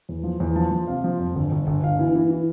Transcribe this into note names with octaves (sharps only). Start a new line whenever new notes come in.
E2
F3
E2
F3 A5
F3
C3 F5
F3
F2
G1
G1
G1
G1 F5
E3
E3
E3